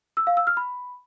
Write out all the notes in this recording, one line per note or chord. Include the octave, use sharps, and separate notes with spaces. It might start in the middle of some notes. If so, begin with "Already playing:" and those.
E6
F5
E6
F6
B5